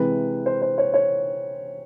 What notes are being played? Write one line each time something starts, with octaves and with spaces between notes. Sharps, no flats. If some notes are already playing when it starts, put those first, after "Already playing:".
Already playing: C3 E3 G#3 B4
C5
C5
C#5
C#5